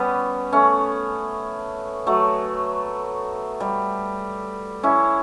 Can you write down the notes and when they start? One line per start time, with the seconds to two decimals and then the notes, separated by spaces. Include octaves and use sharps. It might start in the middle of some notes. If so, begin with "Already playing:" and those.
Already playing: G3 B3 C#4
0.53 A3 C#4
2.07 F#3 A3
3.60 G3
4.83 C#4 E4